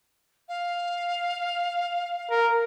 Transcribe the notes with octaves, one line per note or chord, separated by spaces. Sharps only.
F5
A#4